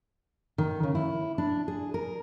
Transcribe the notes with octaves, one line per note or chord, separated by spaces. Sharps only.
D#3
C#3
E4
D4
G#4
A#4